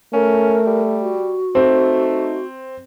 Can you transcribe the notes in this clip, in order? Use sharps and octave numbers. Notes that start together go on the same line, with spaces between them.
A3 C#4 A#4
G3
F#4
A3 C4 D#4